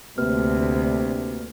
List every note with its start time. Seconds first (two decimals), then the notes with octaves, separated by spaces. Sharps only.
0.18 D2 C3 A#3 B4 F6